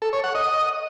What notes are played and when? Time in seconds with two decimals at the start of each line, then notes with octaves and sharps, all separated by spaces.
0.02 A4
0.13 C#5
0.24 F#5
0.35 D#5